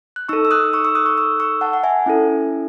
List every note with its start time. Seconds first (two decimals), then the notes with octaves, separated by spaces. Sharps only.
0.16 F#6
0.29 D#4 A4 C#6 E6
0.45 E6
0.51 D#6 F#6
0.64 F#6
0.73 C#6 E6
0.85 C#6 E6
0.95 D#6 F#6
1.06 C#6 E6
1.18 C#6 E6
1.40 C#6 E6
1.61 F#5 A5
1.73 F#5
1.83 E5 G#5
2.06 C#4 E4 A4